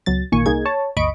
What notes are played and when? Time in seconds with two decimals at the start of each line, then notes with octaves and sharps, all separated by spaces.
0.06 C#2 B2 F#3 A6
0.32 A1 A#2 D#3 A#3 G#5 C#6
0.46 C2 A#3 D#4 G#4 G#6
0.65 C#5 A5
0.97 G1 D2 D#5 B5 C#6 D7